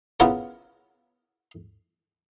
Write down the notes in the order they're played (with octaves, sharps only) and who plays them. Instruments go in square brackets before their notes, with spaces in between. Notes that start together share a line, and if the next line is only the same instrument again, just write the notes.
[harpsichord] C#3 B3 E4 F4 A#4 C#5